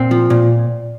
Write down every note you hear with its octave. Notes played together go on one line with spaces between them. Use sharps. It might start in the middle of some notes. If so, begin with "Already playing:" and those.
Already playing: A#2 C4
F3
A#2